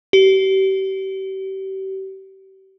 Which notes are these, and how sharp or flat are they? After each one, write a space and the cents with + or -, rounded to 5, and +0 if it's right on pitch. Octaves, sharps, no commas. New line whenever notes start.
G4 -35